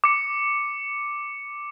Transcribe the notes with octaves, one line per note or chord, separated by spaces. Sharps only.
D6 C#7